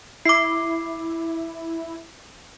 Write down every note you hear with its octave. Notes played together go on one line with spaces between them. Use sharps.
E4 D6 C7